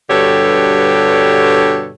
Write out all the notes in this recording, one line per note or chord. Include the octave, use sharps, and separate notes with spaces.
G2 B2 D3 G4 A4 C#5